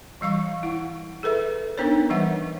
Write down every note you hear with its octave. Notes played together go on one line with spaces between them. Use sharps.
E3 G3 F5 C#6
E4 F#5
G#4 A4 B4 E5
B3 D4 D#4 A#4 C5 C#5
E3 G3 B4 E5 F#5